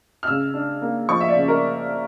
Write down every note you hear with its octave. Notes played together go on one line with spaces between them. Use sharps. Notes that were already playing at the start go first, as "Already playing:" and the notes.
F6
C#3 E6
D4
A#3
F3 C#6
E5
D5
C#3
A#4